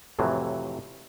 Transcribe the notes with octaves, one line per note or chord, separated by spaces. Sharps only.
F2 A2 C3 E3 F#3